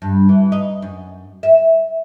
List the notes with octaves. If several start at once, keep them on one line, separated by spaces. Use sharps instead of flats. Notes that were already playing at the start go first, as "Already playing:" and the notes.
G2
E3
D#4
F#2
E5